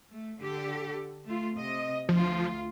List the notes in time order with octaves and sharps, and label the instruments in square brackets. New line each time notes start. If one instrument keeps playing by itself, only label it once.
[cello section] A3
D3 G4 A4
A3 F4
C3 D#5
[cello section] D2 F4 [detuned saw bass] F3